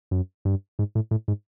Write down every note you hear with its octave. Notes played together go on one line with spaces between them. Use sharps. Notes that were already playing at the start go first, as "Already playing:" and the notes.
F#2
G2
G#2
A2
A2
G#2